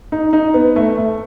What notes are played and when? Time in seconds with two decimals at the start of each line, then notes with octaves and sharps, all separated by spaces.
0.12 D#4
0.33 D#4
0.54 B3
0.76 A3
0.98 A3